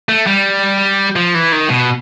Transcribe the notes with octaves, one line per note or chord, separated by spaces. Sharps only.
A3
G3
F3
E3
D#3
B2